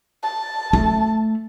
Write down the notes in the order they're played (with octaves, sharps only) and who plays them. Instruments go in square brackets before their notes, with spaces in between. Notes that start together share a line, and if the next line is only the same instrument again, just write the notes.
[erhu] A5
[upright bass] A3